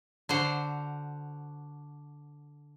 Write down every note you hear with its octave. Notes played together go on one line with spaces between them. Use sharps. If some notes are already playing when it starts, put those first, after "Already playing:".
D3 F#4 C5